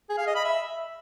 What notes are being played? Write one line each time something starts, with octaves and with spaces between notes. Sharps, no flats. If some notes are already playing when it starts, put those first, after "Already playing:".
G#4
F5
D#5
B5
E5